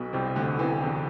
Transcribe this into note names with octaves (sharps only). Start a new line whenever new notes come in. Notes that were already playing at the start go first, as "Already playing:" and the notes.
Already playing: B1 B2
C2 C3
D2 D3
E2 E3
E2 E3